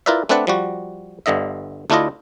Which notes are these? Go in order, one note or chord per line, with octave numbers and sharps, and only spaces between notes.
E4 F4 A#4 B4 D5 E5
A3 C4 D4 B4 D5 F#5
F3 G3 F#4
G1 G2 D3 D#5 E5
D2 A3 D4 E4 F4 D#5